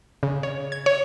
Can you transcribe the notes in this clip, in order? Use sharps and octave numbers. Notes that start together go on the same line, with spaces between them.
C#3
C#5
G#6
C#5